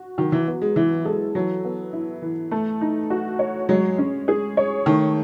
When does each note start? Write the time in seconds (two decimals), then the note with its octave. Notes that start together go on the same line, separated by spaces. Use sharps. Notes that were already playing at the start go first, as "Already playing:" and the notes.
Already playing: F#4
0.18 D#3 F#3
0.32 E3
0.47 B3
0.62 G#3
0.76 E3 E4
1.05 G#3 A4
1.35 E3 F#3
1.65 B3
1.93 E4
2.22 E3
2.51 A3
2.81 D#4
3.10 F#4
3.39 C#5
3.69 F#3 G#3
3.98 C#4
4.28 G#4
4.57 C#5
4.86 D#3 A3